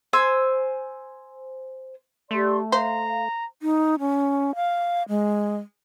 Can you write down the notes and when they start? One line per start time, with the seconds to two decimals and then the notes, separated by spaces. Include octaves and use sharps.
0.13 C5 G#5 E6
2.31 A3 G4 D5 C6
2.72 C5 F5 A#5
3.62 D#4
3.99 C#4
4.55 F5
5.09 G#3